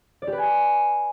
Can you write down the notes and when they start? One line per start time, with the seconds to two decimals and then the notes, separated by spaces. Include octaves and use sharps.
0.22 D5
0.27 G4
0.33 B4
0.38 G#5